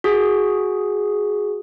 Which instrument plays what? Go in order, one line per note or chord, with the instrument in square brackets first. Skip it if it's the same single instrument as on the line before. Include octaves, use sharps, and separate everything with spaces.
[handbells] F#4 G#4